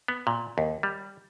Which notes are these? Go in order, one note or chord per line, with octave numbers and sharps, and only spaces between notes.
B3
A#2
D#2
G3